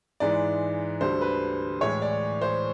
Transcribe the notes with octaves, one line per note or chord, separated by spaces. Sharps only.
G#2 E3 G#3 D5
D2 D3 G3 C5
B4
A2 E3 G#3 C#5
D5
C5